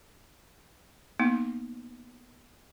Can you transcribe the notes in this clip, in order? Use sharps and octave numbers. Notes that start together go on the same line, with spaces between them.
A#3 B3 D#4